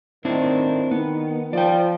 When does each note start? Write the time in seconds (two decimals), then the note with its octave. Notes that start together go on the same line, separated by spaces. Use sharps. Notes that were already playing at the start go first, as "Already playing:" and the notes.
0.25 A2 D#3 C4 D4 E4
0.91 D#3 B3
1.53 F3 D5 G5